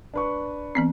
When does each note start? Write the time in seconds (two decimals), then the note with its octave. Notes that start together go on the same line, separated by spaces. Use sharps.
0.14 D4 B4 C#6
0.75 E3 B3 C4